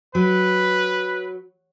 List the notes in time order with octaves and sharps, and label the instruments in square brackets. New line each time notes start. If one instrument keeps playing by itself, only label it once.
[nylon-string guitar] F#3 [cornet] B4